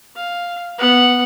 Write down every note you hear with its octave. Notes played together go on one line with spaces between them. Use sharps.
F5
B3 F#5